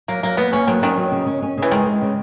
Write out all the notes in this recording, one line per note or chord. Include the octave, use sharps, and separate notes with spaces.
F#3 A#3
F#3 A#3
A#3 B3
A#3 C#4
D#3 F#3
D#3 C#4
F#3
C#3
C#4
C#4
C#3 E3
D#3 G#3
G#3
C#3